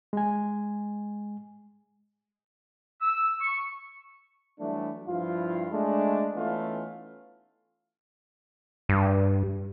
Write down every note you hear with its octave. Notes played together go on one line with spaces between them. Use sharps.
G#3 G#5
E6
C#6
E3 F#3 G3 A3 D4
G2 F3 E4 F4
G#3 A3 D4
E3 A3 B3 C#4 D#4 F4
G2